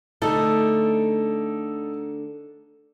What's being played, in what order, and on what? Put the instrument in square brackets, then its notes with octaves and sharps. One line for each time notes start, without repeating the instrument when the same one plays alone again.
[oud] D3 A3 [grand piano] D#4 A4